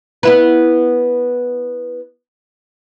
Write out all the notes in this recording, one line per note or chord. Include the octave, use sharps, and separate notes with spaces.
B3 E4 B4